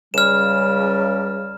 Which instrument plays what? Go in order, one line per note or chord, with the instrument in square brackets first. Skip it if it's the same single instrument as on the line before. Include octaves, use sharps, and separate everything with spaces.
[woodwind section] C#2 C#3 G3 [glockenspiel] F6 E7